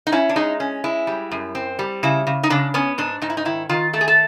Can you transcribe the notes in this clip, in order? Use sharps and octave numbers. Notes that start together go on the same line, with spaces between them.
D#4
C#4 E4
D4
G#3 D#4
C#4
G#3 E4
G3
F#2
C4
G3
C#3 E4
C#3
D#4
C#3 D4
B3 C#4
G#2 D4
G#2 D#4
E4
D#4
D#3 E4
D#3 F4
A3 A4
G#4
A4